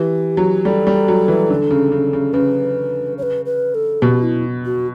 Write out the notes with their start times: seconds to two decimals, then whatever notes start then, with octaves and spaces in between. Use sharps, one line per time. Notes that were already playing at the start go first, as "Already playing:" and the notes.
Already playing: E3 G4
0.37 F#3
0.65 G3 A4
0.87 G3
1.08 F#3
1.28 E3
1.50 D3
1.70 C#3
1.92 C#3
2.13 C#3
2.33 C#3 B4
3.18 C#5
3.23 B4
3.45 B4
3.75 A4
4.02 B2 G4
4.23 E4
4.65 F#4